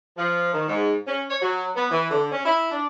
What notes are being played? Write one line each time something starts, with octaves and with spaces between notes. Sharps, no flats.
F3
D#3
G#2
C#4
C#5
F#3
B3
E3
D3
C#4
E4
D4